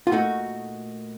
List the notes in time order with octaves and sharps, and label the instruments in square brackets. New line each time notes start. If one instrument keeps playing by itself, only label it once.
[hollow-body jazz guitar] F4
A#2 A3 D#4 F#4